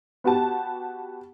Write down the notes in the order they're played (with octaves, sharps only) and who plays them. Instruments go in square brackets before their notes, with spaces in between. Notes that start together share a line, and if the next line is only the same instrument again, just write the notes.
[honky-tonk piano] B3 F#4 G4 A5